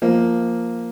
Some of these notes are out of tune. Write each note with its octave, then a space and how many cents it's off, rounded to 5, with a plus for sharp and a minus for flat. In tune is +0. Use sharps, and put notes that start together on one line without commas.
F3 -5 A#3 +0